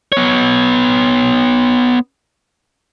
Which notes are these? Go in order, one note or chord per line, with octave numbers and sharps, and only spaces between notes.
B3 C#5